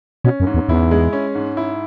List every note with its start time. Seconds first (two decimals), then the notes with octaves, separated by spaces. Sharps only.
0.24 B2 C#4
0.40 F#2
0.47 G#2
0.54 E2
0.69 E2 E4
0.91 G#3
1.13 C#4
1.35 G#2
1.57 E4